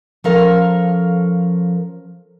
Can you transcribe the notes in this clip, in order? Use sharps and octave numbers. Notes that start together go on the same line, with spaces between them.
F3 C#4 A4 A#4 F5